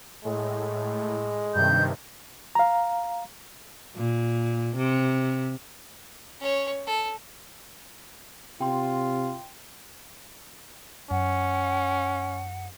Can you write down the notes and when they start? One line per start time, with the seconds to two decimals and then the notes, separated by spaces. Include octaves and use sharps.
0.25 A2 G#3
1.55 G2 C3 D#3 G6
2.55 F5 A#5
3.96 A#2
4.76 C3
6.40 C#4 C#5
6.87 A4
8.61 C3 F4 G5 C6
11.11 F#2 C#4 F#5